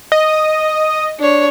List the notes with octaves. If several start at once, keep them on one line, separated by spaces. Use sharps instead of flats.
D#5
D4 C#5